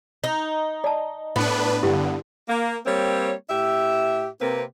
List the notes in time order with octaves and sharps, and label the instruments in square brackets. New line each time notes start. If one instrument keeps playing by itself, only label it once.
[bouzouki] D#4
[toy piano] D5 A5
[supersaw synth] A2 D4 B4 [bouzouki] B3
[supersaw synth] G2 D3 [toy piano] E4 G4
[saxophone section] A#3
G3 A#3 C4 C#5
A2 G4 E5
C3 A#3 C4 A#4 B4